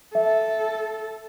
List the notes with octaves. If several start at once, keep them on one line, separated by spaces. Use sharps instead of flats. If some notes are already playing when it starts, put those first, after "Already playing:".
A4 E5